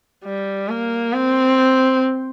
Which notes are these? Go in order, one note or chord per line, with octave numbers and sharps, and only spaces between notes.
G3
A#3
C4